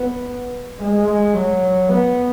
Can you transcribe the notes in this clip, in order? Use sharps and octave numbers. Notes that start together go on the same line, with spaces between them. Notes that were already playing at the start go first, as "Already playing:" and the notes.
Already playing: B3
G#3
F#3
B3